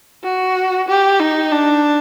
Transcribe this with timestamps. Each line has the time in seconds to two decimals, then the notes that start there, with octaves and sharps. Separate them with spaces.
0.24 F#4
0.88 G4
1.20 D#4
1.51 D4